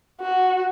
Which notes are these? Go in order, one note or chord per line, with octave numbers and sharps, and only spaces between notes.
F#4